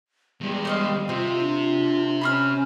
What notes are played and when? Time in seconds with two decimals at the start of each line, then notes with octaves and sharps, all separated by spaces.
0.41 E2 G3 G#3
0.65 A3 D#5 F5
1.09 C3 C4 F4
1.41 D4 F4
2.21 C#4 B5 C6 F6